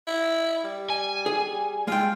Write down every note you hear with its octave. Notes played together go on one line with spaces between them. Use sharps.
E4
G3
G#5
G#4
G#3 F4 G5